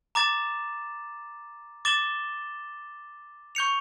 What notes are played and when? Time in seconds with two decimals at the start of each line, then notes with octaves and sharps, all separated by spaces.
0.15 A#5 D6 A6 E7
1.85 D6 A6 E7 G7
3.55 C#6 G6 C#7 F7